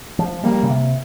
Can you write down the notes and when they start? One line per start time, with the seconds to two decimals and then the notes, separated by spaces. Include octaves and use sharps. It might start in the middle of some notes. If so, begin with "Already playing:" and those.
0.19 F3
0.44 G3 A#3
0.63 C#3
0.70 C3